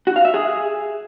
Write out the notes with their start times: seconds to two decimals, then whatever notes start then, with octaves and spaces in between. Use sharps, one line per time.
0.07 F#4
0.16 F5
0.25 E5
0.34 G#4